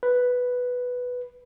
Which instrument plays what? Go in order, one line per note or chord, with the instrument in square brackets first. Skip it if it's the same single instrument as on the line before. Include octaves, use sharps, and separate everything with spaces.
[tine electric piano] B4